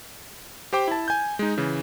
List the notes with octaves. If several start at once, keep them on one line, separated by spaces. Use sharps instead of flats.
G4 C5 G5 D6
E4 A5
G#5 G6
G#3 D#4
C#3 E3